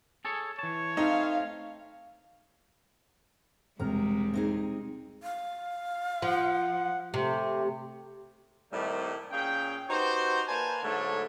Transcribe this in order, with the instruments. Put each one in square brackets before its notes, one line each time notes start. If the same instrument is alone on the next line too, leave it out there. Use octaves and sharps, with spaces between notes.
[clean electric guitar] G#4 A4 C#5
[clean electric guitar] E3 A5 [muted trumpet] C#5
[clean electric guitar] A3 C4 [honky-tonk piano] D#4 [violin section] F5
[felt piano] E1 C3 F6 [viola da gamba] G3 G#3 [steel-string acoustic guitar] A#5
[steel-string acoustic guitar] C4 D#4 G#4
[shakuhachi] F5
[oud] F3 [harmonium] F#5
[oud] C3 [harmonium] A3 G4
[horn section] A2 C3 D#3 G3 A3 A#3
A#2 C#4 G#4 F5 G5
D#4 F#4 G4 B4 C5
A#3 B4 C5 D5 G#5 A5
G#2 D3 F#3 A3 A4 C#5